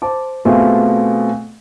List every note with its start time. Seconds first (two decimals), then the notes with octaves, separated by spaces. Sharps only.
0.02 C5 A5 D6
0.45 B2 A3 C4 F4 G#4